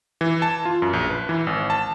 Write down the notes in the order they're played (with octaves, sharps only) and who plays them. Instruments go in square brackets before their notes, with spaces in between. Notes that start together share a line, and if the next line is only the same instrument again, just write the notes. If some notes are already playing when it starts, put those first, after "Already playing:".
[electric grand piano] E3
A5
F4
F#2
A#1
B4
E3
G#1
A5